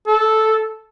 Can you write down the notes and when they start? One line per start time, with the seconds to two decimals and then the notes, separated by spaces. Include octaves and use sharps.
0.07 A4